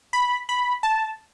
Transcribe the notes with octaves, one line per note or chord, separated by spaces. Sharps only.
B5
B5
A5